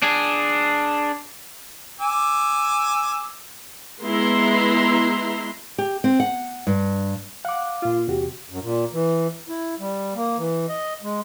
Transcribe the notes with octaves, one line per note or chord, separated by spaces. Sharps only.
D4 G#4
G#5 D6 E6
G#3 B3 E4 E5 A#5 C6
G4
C4
F#5
G2
F5 F#5 D6
A#2 F4
E2 C3 F#4 G4
F#2
A#2
E3
E4
G3
A#3
E3
D#5
G#3